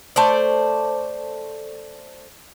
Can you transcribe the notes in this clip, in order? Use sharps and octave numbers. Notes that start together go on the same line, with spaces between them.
A3 C5 D5